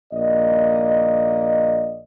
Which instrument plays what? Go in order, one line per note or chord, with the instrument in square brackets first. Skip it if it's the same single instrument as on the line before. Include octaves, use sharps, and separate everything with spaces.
[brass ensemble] A#1 A#3 D5 D#5